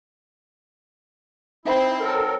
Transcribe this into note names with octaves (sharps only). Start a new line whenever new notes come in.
C4 D#4 E4 C5 E5 B5
F#3 A4 A#4